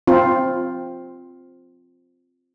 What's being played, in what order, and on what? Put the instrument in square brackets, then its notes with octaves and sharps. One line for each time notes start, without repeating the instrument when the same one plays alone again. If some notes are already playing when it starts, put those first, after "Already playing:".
[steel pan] C4 F4